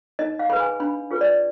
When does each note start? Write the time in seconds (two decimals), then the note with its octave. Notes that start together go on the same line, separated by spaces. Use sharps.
0.19 D#4 D#5
0.39 F5
0.50 G#4 B4 B5
0.60 G#5
0.80 D4 B5
1.11 F4 G#4 B4
1.21 D5